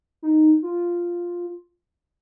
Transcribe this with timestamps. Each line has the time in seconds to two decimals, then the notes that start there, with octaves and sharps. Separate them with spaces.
0.22 D#4
0.62 F4